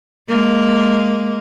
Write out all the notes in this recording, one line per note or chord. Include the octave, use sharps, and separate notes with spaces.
G#3 A#3